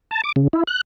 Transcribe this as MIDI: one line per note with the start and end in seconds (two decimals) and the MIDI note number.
0.11 0.22 81
0.24 0.32 86
0.36 0.48 49
0.53 0.63 64
0.67 0.81 90